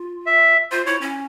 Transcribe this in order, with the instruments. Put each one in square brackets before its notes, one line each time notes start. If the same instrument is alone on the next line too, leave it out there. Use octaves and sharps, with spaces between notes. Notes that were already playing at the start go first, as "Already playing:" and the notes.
Already playing: [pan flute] F4
[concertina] E5
[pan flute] F4 [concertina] C5
[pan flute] E4 [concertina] C#5
[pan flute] C#4